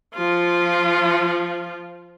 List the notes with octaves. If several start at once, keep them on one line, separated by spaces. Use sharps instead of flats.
F3 F4